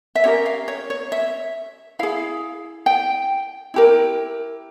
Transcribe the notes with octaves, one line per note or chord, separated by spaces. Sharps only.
E5
C#4 G4 A#4 C#5
F5
C#5
C#5
E5
E4 G#4 F5
G5
E4 G4 A#4